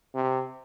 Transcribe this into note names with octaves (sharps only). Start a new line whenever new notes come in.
C3